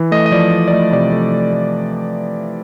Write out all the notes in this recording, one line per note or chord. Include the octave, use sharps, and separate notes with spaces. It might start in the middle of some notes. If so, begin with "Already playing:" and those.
Already playing: E3
A3 D#5
D#5
F3 D5
A3
D5
A3 D#5
C3 D5
A3
A3
A3